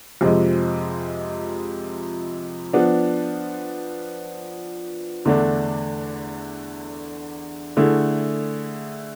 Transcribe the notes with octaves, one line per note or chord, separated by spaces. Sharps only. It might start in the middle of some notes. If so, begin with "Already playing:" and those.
F2 C3 F3 G#3
F3 B3 D4
E2 D3 A3 D4
D3 A3 E4 G#4